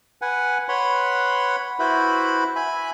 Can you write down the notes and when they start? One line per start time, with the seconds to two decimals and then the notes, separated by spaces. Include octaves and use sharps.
0.22 B4 F#5 G#5
0.69 B4 C#5 F#5 B5 C6
1.79 E4 F#4 B4 C5 E5 B5
2.56 E5 G#5 B5